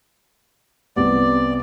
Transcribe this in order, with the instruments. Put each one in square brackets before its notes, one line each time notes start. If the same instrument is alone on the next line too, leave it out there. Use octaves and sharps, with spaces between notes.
[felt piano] C2 C3 B3 [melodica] D5